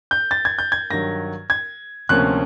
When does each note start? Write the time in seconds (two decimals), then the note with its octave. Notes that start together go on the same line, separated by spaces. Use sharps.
0.11 G6
0.31 A6
0.45 G#6
0.58 G6
0.72 G#6
0.90 G2 D#3 F#3 A#6
1.50 G#6
2.09 D2 C3 F3 A#3 C#4 F#6